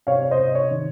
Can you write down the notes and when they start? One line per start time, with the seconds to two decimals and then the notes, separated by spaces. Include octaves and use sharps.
0.07 C3 C#5 F5
0.20 C#5
0.31 C5 D#5
0.39 C3
0.55 C#5
0.71 D#3